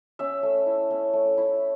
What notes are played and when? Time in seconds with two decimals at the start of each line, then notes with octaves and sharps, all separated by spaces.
0.19 C#4 E5
0.43 A3
0.66 E4
0.90 C#4
1.13 A3
1.38 E4